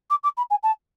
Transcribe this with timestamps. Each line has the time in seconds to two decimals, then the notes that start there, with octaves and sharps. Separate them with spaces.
0.10 D6
0.23 D6
0.37 B5
0.50 G#5
0.63 A5